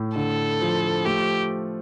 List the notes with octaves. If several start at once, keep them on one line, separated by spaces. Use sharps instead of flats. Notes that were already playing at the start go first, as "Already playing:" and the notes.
Already playing: A2
D3 A4
F3
A3 G4